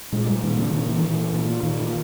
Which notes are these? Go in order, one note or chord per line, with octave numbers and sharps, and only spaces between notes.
A#2 G#3
G3
A#2 D#3
D3
A#2 D#3
E3
A#2
A#2
A#2 D#3